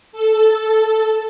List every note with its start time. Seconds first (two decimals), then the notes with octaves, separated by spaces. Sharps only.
0.12 A4